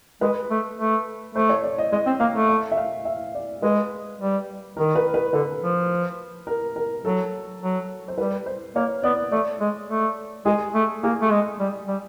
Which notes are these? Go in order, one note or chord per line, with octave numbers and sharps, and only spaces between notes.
G#3 B4
A3
A3
A3 C5
C#5
D5
D#5
G#3 D#5
C4
A#3 F5
A3
E5
E5
F5
E5
D5
G#3 B4
G3
D#3 A#4
B4
B4
D3 B4
F3
A#4
A#4
F#3 A4
F#3
C5
G3 B4
C5
A#3 C#5
B3 D5
A3 D5
G#3
A3
G#3 G#4
A3
A#3 G#4
A3
G#3
G3
G3